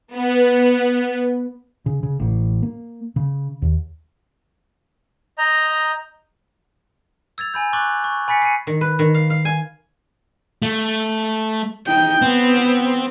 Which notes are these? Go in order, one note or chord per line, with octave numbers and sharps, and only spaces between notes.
B3
C#3
C#3
A1
A#3
C#3
D#2
D#5 A#5 G6
E6 G#6 A6 F7
G#5 B5 G6
C#6 D6 F#6 A6 F#7
C#6
G#5 B5 A6 B6 C#7
C7 C#7 D#7
D#3
B4
D#3
F5
F5
G#5
A3
D#4 G5
B3 C4